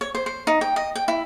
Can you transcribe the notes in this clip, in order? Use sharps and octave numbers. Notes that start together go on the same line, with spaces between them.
C#5
C5
C5
D#4
G5
D#5
G5
E4